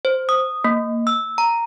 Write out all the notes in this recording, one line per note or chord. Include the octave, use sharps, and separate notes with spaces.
C5
D#6
A#3
E6
A#5